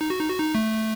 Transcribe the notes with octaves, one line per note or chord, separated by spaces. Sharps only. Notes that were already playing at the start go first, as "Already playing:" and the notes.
D#4
F#4
D#4
F#4
D#4
A3